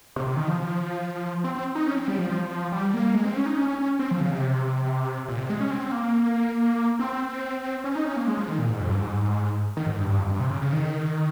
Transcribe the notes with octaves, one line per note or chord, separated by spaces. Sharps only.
C3
C3
D#3
F3
C4
C4
D#4
C#4
C4
G3
F3
F3
G3
A#3
G#3
C4
C#4
D#4
C#4
C#4
C#4
C4
F3
C#3
C3
A#2
C3
G#3
C#4
C4
A#3
C4
C#4
D#4
C#4
A#3
G#3
F3
D#3
A#2
G#2
F2
G2
G#2
D#3
G#2
G2
G2
F2
G2
C3
C#3
C#3
D#3